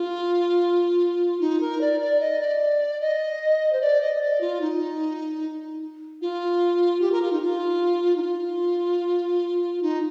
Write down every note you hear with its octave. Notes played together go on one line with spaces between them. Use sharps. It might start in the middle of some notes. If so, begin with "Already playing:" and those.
Already playing: F4
D#4
A#4
D5
D5
D#5
D5
D#5
C5
D5
D#5
D#5
D5
F4
D#4
F4
G4
A#4
F4
D#4
F4
D#4
F4
D#4